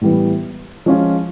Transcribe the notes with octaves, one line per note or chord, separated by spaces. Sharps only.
A2 E3 G3 B3
F3 G#3 C#4 F4